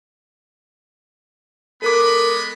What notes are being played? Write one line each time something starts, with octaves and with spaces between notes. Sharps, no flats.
G#3 B3 A4 A#4 B5 D6